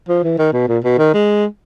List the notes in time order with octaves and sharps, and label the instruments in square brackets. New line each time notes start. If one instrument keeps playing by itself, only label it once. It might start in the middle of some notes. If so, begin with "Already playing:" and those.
[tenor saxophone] F3
E3
D#3
B2
A#2
B2
D#3
G#3